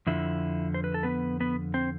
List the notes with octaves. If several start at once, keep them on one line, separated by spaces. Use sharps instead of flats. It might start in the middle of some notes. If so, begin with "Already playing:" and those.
F2 D3 F3 E4
C5
B4
A4
B3 B4
B3 B4
C4 C5